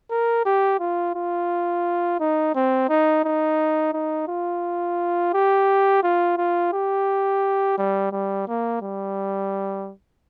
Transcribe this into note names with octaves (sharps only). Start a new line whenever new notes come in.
A#4
G4
F4
F4
D#4
C4
D#4
D#4
D#4
F4
G4
F4
F4
G4
G3
G3
A#3
G3